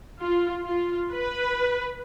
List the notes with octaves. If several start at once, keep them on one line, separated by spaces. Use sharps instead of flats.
F4
F4
B4